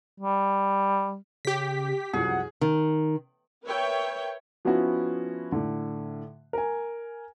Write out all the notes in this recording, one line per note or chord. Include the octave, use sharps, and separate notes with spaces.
G3
C#3 G4 B6
C2 F#2 F3 G#4 F#5
D#3
A#4 B4 C#5 E5 G5
F3 B3 C#4 E4 F#4
A2 D3
A#4 G#5